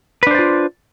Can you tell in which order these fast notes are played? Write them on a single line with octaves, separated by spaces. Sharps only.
B4 D4 C5 D5 F4